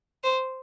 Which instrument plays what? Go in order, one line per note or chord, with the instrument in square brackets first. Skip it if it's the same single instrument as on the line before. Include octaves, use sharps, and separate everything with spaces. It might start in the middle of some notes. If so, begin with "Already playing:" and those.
[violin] C5